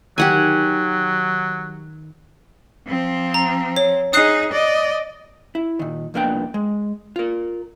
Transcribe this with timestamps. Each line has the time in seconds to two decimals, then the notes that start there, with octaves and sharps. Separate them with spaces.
0.18 D#3 F#3 G4 F#5 G#5
2.87 F3 C4
3.34 A#5
3.76 C#5
4.13 D#4 G#4 D#6 F#6 C7
4.53 D5 D#5
5.55 E4
5.79 A#2 D#3
6.14 C2 F2 A#3 B3 D4 G5
6.54 G#3
7.16 F4 A#4